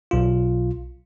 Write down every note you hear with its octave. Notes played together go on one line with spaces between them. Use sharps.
B1 F4